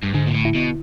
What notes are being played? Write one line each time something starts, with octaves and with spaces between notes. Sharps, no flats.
G2
G#2 D3
A#2
A2
E4
B2